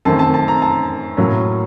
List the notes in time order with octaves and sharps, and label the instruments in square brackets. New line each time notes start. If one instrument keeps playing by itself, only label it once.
[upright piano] F#2 D#3 A3 C4 A5
A5
A5
A#5
A5
A2 F#3 A#3 C#4